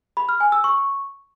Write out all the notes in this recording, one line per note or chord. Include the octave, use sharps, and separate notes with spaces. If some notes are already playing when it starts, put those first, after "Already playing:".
B5
F6
G#5
E6
C#6